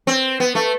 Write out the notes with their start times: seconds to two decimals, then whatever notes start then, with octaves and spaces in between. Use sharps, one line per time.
0.07 C4
0.40 B3
0.55 A3